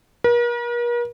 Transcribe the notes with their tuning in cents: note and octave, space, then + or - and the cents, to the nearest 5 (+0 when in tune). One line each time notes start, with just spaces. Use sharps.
A#4 +45